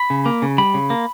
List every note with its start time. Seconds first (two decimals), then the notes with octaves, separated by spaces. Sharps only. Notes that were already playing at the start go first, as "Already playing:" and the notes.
Already playing: B5
0.10 C#3
0.26 A#3
0.42 C#3
0.58 G3 B5
0.74 C#3
0.90 A#3